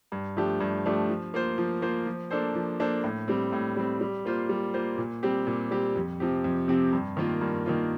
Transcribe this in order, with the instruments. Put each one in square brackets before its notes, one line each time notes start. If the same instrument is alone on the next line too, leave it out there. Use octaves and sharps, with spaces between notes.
[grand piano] G2
F3 A3 D4 G4
G2
F3 A3 D4 G4
F3
A#3 F4 C5
F3
A#3 F4 C5
F3
A#3 D4 A4 C5
F3
A#3 D4 A4 C5
A2
G3 C4
A2
G3 C4
G3
A#3 F4 C5
G3
A#3 F4 C5
A#2
G3 C4 G4
A#2
G3 C4 G4
F2
C3 F3 C4 G4
F2
C3 F3 C4 G4
G2
D#3 A#3 F4
G2
D#3 A#3 F4